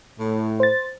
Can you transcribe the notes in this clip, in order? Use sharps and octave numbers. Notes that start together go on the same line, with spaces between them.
A2
C5 A6